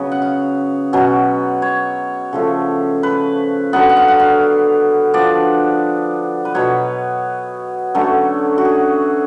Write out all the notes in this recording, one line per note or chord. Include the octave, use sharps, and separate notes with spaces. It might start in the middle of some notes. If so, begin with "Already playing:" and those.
Already playing: C#3 F#3 B3
F#5
F5
B2 F#3 C#4
C#5
C#3 F3 A3
B4
D3 F#3 B3 F#5
F#5
F5
F#5
F5
F3 B3 D4 D5
B4
B2 F#3 B3 C#5
D3 F#3 A3 C#4
F#4
G#4